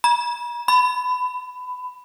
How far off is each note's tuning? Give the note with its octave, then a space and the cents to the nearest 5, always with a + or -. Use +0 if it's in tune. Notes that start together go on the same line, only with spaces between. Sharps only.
B5 -45
B5 +20